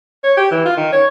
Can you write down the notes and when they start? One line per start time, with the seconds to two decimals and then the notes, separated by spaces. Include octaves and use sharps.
0.24 C#5
0.37 G4
0.51 E3
0.65 F4
0.77 D#3
0.92 C#5